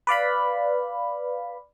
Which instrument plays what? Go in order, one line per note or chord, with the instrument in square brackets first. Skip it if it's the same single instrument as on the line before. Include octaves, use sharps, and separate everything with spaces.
[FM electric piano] B4 D5 F5 B5